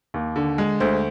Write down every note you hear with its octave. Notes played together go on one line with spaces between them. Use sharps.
D#2
D3
G#3
D2 C5